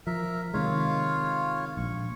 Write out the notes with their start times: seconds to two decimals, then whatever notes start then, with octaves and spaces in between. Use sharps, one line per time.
0.07 F3 A#4 E5
0.54 C3 D#3 G#3 F4 C#5 F5
1.77 A#1 C#6